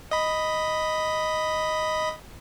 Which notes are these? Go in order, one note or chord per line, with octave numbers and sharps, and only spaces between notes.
D#5 B5